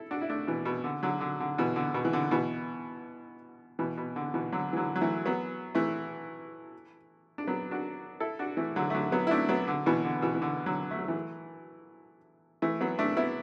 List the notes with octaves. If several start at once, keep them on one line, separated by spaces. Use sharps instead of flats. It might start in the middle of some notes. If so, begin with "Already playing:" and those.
Already playing: E4 A4
D4 F#4
E4
A3 D4
B2 E3
B2
D3
D3 F#3
D3
D3
B2 E3
D3
B2
E3
D3
B2 E3
B2 E3
B2
D3
B2 E3
D3 F#3
E3
D3 F#3
F#3
E3 A3
F#3 B3
E3 A3
D4
F#3 B3
D4 F#4
E4 A4
D4 F#4
E3 A3
D3 F#3
A3
D3 F#3
F#3 B3
E4
A3 D4
F#3 B3
D3
B2 E3
D3
B2 E3
E3
D3
D3 F#3
A3
F#3
E3 A3
E3 A3
F#3 B3
A3 D4
B3 E4